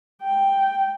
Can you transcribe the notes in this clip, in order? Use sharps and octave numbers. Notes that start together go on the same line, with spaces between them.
G5